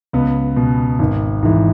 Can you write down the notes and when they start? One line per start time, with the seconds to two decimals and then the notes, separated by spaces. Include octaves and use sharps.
0.13 C#2 B3
0.57 B2
0.99 G#1
1.42 G#2 E3